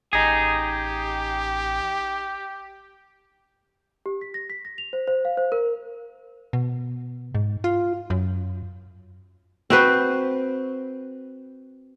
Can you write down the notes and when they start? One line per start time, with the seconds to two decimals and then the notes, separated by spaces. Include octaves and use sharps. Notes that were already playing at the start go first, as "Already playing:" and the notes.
0.13 A1 D#4 G4 G#4
4.06 G4
4.21 B6
4.34 A#6
4.50 B6
4.65 A#6
4.78 F7
4.93 C5
5.07 C5
5.25 F5
5.37 C5
5.52 A#4
6.53 B2
7.35 G#2
7.64 F4
8.10 F#2
9.70 C4 F#4 B4 C5